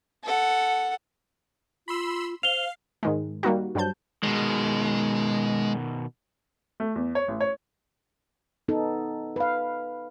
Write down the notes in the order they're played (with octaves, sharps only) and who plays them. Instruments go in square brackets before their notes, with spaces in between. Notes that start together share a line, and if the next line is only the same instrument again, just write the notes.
[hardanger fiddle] A4 F#5
[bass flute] F4 [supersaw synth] B5 C6 E6
[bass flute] C5 [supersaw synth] F5 [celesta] F7 G7
[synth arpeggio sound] G#2 D#3 G#3
G3 A#3 D#4 F#4
G2 F#3 G3 C5 A5 G6
[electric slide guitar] B2 D#3 [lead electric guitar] G#3
[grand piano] A3
E2
C#5
A1
C#5
[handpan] B3 D#4 A4
B4 F5